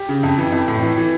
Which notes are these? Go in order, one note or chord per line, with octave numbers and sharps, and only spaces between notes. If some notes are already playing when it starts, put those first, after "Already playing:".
Already playing: G4
C#3
F2
E3
F2
A2
E3
E3